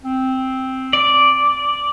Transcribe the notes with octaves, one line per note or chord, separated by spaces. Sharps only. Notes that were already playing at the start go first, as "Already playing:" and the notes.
C4
D5